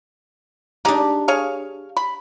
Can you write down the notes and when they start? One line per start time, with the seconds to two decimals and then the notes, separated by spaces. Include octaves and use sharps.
0.85 G#3 D4 D#4 G4
1.28 G#4 C#5 F5
1.97 B5